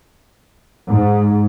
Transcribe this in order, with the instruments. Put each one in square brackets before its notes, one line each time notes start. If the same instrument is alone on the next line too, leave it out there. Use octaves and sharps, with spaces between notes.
[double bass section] G#2